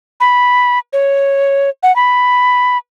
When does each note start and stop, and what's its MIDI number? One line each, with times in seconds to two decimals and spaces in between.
0.20 0.79 83
0.93 1.70 73
1.83 1.94 78
1.96 2.78 83